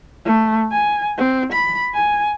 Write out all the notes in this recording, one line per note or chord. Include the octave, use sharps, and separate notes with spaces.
A3
G#5
C4
B5
G#5